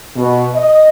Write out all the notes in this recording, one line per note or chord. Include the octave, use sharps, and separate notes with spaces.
B2
D#5